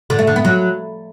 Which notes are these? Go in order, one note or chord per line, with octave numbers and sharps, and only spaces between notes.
D3
A3
D3
B3
F#3